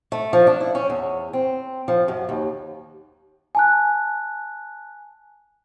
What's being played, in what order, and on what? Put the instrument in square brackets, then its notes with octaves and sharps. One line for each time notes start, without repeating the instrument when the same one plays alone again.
[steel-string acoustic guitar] A3
F3
D4
E4
C#4
E2
C4
F3
F#2
D#2
[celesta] G#5 A5 F#6